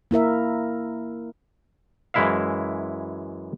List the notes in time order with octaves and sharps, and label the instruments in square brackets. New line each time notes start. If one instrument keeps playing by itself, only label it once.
[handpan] A#3 E4 A#4 E5
[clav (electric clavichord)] F#2 E3 G#3 E4 E5 F5